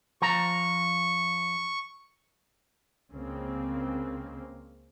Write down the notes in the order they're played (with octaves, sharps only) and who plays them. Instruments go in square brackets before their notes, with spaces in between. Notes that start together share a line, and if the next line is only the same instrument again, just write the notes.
[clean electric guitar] F3 A#5 [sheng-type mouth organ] C#6
[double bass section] C#2 C#3 A#3 C4